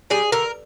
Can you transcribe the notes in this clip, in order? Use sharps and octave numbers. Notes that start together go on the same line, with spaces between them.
G3 G#4
D3 A#4